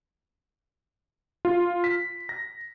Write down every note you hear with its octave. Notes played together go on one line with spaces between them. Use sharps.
F4
B6
A#6